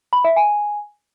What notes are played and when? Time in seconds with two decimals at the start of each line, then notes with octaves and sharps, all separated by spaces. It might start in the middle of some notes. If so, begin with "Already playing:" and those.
0.13 B5
0.24 E5
0.36 G#5